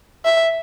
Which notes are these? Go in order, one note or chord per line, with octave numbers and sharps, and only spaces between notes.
E5